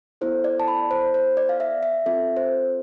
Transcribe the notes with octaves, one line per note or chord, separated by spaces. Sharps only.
B3 E4 A4 C5
D5
A5
B5
C5
C5
D5
F5
E5
E5
C4 F4 A4 E5
C5